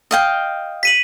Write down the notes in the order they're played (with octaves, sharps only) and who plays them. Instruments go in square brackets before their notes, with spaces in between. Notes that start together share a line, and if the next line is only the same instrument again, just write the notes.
[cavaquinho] D#5 F5 G5
[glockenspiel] B6 D#7 F#7